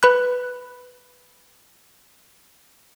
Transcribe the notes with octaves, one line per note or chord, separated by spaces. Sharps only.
B4 B5 F#6